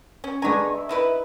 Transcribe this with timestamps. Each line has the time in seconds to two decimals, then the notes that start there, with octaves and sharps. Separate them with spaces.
0.24 C#4
0.42 G#3 B3 D4 G#5 A#5 C#6
0.72 E5
0.89 D#4 E4 B4